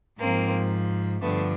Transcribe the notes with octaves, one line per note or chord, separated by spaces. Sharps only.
G#2 F3 A#3 C4
G2 D3 F3 A3 B3